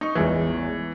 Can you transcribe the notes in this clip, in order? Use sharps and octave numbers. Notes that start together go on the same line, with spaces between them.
D#4 C#6
A1 E2 E3 G#3